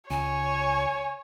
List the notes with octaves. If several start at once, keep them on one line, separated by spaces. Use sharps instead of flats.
C#2 C#5 G#5